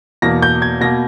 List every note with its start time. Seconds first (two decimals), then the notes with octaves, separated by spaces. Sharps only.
0.22 E2 B2 A#3 A#6
0.42 G6
0.62 G#6
0.81 B2 A#3 A#6